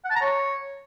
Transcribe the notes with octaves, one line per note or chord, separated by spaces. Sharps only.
F#5
A5
A#5
C#5